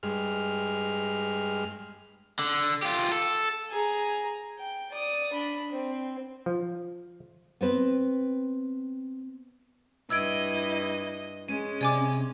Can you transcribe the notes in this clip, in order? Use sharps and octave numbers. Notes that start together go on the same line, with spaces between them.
G2 G#3 F6
D3
F4 G4
A4
G#4 A#5
G5
D5 D#6
D4 B5
C4
F3
B3 C4 B4
G2 E4 D#5 E6 G#6 D7
G#3 C#4 D#7
C3 D5 G#5 D6